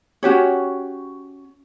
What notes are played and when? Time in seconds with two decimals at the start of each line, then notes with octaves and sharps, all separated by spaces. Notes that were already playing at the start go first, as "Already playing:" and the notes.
0.23 C#4 F#4 G4 C#5